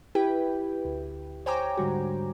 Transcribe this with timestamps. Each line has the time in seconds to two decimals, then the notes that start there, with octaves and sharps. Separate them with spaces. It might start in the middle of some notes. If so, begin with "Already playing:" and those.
0.15 E4 G4 B4 G5
0.85 D2
1.46 C5 C#5 G5 G#5 A#5 D6
1.77 G#2 D3 G3 F#4